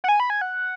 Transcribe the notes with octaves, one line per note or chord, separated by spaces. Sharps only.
F#5
G#5
B5
G#5
F#5